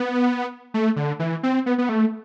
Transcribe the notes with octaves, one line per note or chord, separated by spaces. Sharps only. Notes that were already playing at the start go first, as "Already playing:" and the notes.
Already playing: B3
A3
D3
E3
C4
B3
B3
A3